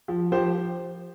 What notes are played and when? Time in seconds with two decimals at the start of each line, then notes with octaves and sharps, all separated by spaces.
0.08 F3
0.32 F3 G4 C5